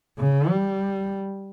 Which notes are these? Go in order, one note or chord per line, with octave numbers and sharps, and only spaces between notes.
C#3
G3